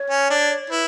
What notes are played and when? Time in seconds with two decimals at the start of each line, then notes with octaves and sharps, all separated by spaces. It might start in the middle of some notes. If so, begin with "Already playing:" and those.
Already playing: C#5
0.10 C#4
0.30 D4
0.70 E4 B4